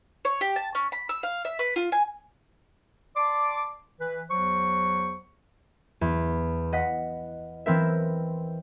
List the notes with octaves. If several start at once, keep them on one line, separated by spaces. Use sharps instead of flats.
C#5
G4
A5
C#4
B5
E6
F5
E5
B4
F4
G#5
D5 A5 C6 D6
E3 B4
E2 F#3 C5 C#6
E2
D#5 F#5 B6
E3 C4 A#4 E5